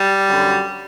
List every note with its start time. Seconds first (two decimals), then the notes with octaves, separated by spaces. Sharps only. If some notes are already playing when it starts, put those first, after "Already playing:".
Already playing: G3
0.26 F#2 D3 F#3